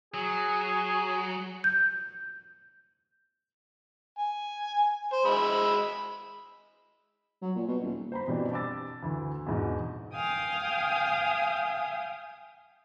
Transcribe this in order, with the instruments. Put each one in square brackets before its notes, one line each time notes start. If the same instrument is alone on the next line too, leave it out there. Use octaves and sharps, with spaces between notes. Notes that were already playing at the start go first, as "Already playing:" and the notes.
[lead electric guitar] F#3 [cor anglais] G#4
[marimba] G6
[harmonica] G#5
C5
G#3 B5 E6
[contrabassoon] F#3
A#2
B2
D#1
[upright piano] C5 A#5 B5
B2 E3 G3 C4 D4
A5 B5 D6 E6 A6
D2 E3
E2 G#2 B2
[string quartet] F5 G5 G#5 D#6